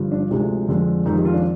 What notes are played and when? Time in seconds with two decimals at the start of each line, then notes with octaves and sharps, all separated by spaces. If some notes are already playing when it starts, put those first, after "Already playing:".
Already playing: G2 D3 F3
0.12 D4
0.31 D2 C3 F3 G#3 D4
0.68 F2 D3 G#3
1.06 F2 D#3 G#3 D#4
1.15 G4
1.25 F4
1.34 D4